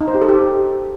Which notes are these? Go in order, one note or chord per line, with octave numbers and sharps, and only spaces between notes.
D#4
C5
G4
A4
G4